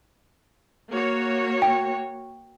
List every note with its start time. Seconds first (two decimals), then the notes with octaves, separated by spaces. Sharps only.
0.91 A#3 F#4 C#5
1.62 G5